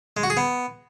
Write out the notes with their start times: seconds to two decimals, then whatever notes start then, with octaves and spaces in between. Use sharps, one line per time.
0.17 G#3
0.23 F#4
0.30 G#4
0.37 B3